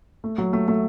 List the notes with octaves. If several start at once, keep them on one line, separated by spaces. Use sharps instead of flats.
A3
F#3
A3
A3